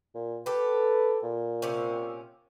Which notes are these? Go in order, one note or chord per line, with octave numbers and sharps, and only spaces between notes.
A#2
G4 A4 B4
A#2
C3 C4 C#4